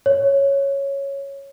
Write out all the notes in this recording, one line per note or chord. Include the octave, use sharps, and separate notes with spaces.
C#5